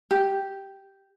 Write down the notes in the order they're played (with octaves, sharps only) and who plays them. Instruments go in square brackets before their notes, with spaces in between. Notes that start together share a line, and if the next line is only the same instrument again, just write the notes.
[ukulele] G4